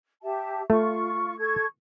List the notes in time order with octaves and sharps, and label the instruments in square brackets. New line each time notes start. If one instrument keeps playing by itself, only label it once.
[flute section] G4 E5 A5
[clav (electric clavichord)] A3 [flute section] F4 C#6
[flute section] A4 C#6 G#6